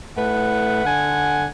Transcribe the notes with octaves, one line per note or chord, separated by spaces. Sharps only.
A2 A3 B4 F#5
D3 F#5 G#5